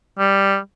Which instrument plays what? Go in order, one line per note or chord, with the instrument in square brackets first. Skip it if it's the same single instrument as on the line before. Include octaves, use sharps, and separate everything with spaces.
[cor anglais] G3